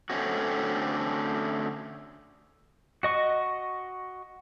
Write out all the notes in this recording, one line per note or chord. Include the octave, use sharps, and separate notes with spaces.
D3 A3 C4 C#4 F#4
F#4 D#5 C#6